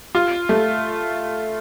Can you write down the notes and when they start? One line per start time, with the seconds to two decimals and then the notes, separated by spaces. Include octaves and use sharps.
0.15 F4
0.49 A3